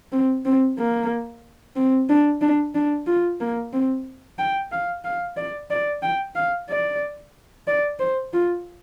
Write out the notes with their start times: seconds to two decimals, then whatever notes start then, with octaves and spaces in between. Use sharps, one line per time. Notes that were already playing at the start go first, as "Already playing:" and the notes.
0.12 C4
0.45 C4
0.78 A#3
1.76 C4
2.09 D4
2.42 D4
2.75 D4
3.07 F4
3.40 A#3
3.73 C4
4.39 G5
4.72 F5
5.05 F5
5.37 D5
5.71 D5
6.02 G5
6.35 F5
6.69 D5
7.68 D5
7.99 C5
8.33 F4